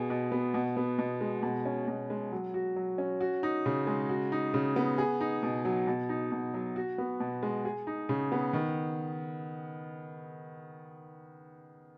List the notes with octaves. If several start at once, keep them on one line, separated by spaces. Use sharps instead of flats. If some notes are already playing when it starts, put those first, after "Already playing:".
Already playing: B2 B3 G#4
B2
B3
B2
B3
B2
G#3
B2
C#4
B2
G#3
F#3
F#4
F#3
C#4
F#4
D#4
C#3
G#3
F#4
D#4
C#3
B3
G#4
D#4
B2
F#3
B2
D#4
B2
F#3
F#4
B3
B2
G#3
G#4
D#4
C#3
B3
D#3